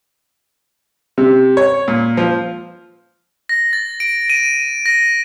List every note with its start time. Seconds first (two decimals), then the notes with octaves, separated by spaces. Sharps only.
1.18 C3
1.57 C#5
1.88 A#2
2.17 F3
3.49 A#6
3.73 A6
4.00 D7
4.30 D#7
4.86 A#6